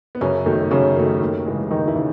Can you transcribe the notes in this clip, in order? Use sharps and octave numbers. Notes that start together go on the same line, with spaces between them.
B3
F#2 C#3 C#4
D#3 F#3 A3
F#2 C#3 C#4
D#3 F#3 A3
D#2
C#3 E3 G#3
D#2 D#3 D#4
E3 E4
C#3